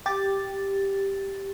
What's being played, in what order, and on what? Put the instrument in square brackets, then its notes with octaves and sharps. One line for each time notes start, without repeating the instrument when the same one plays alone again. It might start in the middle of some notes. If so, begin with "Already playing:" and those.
[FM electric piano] G4 A6